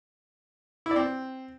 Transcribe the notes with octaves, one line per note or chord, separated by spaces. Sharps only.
E4
D5
C4